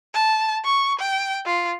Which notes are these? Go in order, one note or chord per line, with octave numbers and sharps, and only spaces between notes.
A5
C#6
G5
F4